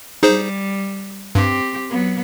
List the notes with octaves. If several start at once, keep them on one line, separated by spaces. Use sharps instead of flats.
G3 D#4 G#4 C5
G2 C4 G4
F#3 B3